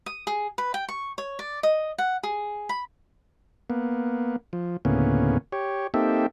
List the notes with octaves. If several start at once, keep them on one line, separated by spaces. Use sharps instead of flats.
D#6
G#4
B4
G5
C#6
C#5
D5
D#5
F#5
G#4
B5
A#3 B3
F3
D2 A2 C#3 A#3 B3 C#4
G4 C#5
A#3 C4 D#4 G4 A4 E5